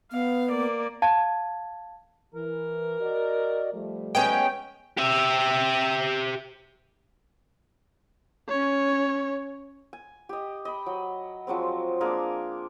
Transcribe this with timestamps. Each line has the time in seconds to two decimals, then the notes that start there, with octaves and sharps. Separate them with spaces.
0.12 B3 F5
0.50 A#3 D5
1.02 F5 A5 G#6
2.35 E3 A#4
3.01 F#4 D5 D#5
3.73 F3 G3 A3
4.15 G#3 B3 C#4 G5
4.98 G4 E5
8.49 C#4 C#5
9.93 G#5
10.29 G4 D#5
10.65 D#5 B5
10.86 F#3
11.47 F3 F#3 G#3 C4
12.01 A#3 D4 G#4 A#4